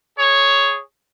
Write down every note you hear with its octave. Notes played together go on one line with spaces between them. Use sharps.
G#4 C#5